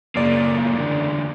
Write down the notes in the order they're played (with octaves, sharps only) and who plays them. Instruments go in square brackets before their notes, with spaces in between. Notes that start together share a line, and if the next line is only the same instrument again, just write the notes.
[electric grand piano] F#2 C#3 D5 [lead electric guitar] A2 A#3
[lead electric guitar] E2 D3